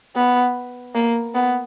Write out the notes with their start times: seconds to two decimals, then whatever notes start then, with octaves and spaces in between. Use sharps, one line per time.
0.15 B3
0.95 A#3
1.34 B3